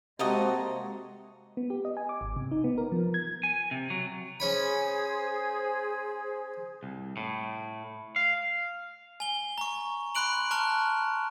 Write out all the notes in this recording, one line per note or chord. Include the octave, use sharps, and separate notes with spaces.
C3 G#3 A#3 C4 F#4 A4 D#5 D#6
B3
G4
D#5
G#5
D6
G#1
C3
D#4
B3
A#4
F3
G#6
G#5
C3
F#3
C#4 G#4 C5 C#5 B5
C2
A2
F5
G#5 G7
A#5 C#6
B5 C6 F#6 D7 F#7
A5 A#5 C#6 F6 F#6